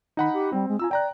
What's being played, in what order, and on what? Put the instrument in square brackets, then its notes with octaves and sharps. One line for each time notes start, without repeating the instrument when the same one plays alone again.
[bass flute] D#3 [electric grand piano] D#4 F#5 B5
[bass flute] G4
[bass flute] G3 [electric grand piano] C4
[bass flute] G#3
[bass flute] F4 [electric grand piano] G#5 A#5 E6
[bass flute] D5 [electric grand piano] G5 A#5 F#6